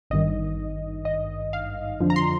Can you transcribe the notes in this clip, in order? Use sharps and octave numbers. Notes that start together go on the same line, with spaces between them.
G#1 G2 D#3 D#5
D#5
F5
F2 D3 F3
A#5
C6